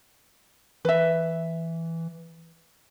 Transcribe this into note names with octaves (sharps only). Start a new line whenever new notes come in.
E3 B4 E5